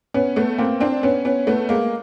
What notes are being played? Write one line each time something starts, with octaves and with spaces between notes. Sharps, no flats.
B3 C#4
A3 B3
A#3 C4
C4 D4
B3 C#4
B3 C#4
A3 B3
G#3 A#3